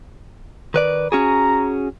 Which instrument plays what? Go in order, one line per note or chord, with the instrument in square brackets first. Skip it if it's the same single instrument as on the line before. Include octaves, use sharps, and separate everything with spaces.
[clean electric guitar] D#3 B4 D5
[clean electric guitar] C#4 F#4 G#4 [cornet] A#5